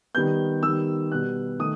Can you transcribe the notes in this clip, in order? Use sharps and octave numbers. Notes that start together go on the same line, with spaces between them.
D#3 G3 B3 G6
D#3 G3 B3 E6
B2 G3 B3 F#6
D#3 A3 D#6